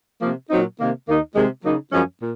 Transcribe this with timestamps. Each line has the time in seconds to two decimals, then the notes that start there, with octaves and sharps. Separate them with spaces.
0.22 C3 F3 A#3
0.50 A#2 F#3 C4 D#4
0.79 C3 D#3 A#3
1.07 D#2 D#3 A#3 D#4
1.35 C3 D#3 G#3
1.64 C#3 F#3 A#3 D#4
1.92 F#2 F3 G#3 C#4
2.20 A#2